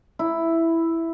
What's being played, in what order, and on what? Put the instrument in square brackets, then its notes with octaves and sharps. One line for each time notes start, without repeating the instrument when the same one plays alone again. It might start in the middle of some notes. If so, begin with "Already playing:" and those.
[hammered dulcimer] E4